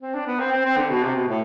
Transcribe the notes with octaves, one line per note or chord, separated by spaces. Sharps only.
C4
D4
B3
C4
C4
C4
D3
B2
C3
B2
A2